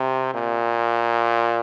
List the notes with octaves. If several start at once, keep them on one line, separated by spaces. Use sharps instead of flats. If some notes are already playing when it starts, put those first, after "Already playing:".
Already playing: C3
A#2